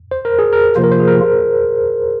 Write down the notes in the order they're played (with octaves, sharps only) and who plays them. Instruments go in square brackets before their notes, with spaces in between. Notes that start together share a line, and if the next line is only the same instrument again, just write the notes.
[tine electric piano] C5
A#4
G#4
A#4
[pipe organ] C3 F3 A#3 F4 [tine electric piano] C5
[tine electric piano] A#4
C5
G#4
A#4